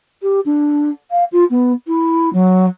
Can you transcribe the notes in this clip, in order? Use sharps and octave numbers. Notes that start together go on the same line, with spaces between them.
G4
D4
F5
F4
B3
E4
F#3